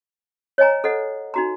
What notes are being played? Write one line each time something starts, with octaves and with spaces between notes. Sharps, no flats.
C#5 D#5 G#5 A#5
A4 C5 D#5 F#5
D#4 F#4 A#5